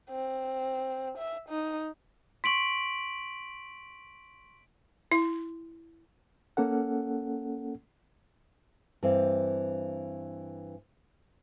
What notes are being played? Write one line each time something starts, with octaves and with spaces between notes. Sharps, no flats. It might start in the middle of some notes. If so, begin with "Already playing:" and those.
C4
E5
D#4
C6 C#6 B6 D7 F#7
E4
A#3 C#4 A4 F#5
G2 E3 C4